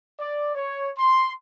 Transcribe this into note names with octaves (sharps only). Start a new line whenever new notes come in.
D5
C#5
C6